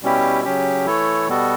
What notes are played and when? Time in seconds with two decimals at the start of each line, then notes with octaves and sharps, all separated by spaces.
0.03 B2 G3 C#4 E4 G4
0.44 C#3 F#3 C#4 G4
0.86 E3 A3 E4 A4 C#5
1.27 B2 G3 B3 F#4 A4